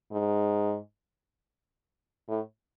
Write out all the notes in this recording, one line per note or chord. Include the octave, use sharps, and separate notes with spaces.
G#2
A2